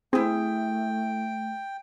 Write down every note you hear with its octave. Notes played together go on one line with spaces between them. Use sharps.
A3 C4 E4 G#4 G5